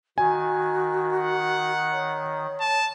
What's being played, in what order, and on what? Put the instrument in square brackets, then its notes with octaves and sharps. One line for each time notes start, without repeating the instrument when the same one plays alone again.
[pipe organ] D#3 [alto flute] F#4 [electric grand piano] G#5
[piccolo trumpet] F#5
[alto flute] C#5
[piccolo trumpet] A5